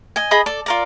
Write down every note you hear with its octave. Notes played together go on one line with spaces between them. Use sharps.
D#5 G#5
G#4 D#5 B5 D#6
A4 D5
F4 A#4 D5